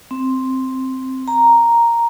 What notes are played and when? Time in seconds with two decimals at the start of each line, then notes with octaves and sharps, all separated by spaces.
0.11 C4
1.28 A#5